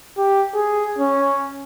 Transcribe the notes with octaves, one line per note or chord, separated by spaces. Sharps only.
G4
G#4
C#4